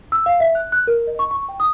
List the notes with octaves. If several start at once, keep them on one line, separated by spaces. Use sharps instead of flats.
E6
F5
E5
F#6
F#6
A#4
D#5
C#6
C#6
G5
D#6